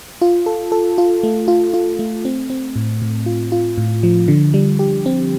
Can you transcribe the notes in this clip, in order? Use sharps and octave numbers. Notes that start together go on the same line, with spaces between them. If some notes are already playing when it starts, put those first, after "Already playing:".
F4
A4
A4
F4
A3
F4
F4
A3
C4
C4
A2
A2
F4
F4
A2
F3
D3
G3
G4
C4